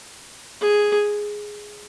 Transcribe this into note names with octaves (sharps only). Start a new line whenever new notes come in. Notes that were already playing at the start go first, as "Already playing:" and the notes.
G#4